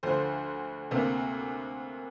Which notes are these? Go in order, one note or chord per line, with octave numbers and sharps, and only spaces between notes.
D2 D3 F3 C5
D2 C3 A#3